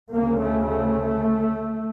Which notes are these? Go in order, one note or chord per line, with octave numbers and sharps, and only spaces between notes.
D2 C#3 A#3
A3
A3